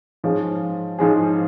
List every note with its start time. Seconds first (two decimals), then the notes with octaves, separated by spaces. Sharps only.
0.24 G#2 F3 G#3 C#4 G#4
0.99 G#2 F3 G#3 C#4 G#4